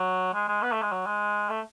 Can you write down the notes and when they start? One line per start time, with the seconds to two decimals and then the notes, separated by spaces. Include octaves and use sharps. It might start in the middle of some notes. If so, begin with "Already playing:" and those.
Already playing: F#3
0.33 G#3
0.48 G#3
0.62 B3
0.72 A3
0.82 G#3
0.92 F#3
1.06 G#3
1.50 A3